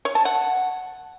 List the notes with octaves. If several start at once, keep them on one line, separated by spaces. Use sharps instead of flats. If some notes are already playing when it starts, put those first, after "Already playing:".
C#5
A5
F#5